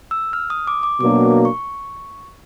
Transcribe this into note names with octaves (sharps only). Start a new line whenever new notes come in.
E6
F6
D#6
D6
D6
B2 F#3 A#3 D4 D6
C#6